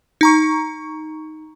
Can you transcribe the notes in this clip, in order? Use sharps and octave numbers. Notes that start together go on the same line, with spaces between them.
D#4 A#5 C#6